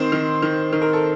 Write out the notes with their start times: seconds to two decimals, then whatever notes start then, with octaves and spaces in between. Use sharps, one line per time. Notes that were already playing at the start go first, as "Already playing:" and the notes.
Already playing: D#3 C4 C5
0.12 D#3
0.42 D#3
0.73 D#3
0.82 A#4
0.93 A4